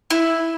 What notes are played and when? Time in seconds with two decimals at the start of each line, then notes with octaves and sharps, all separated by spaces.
0.10 E4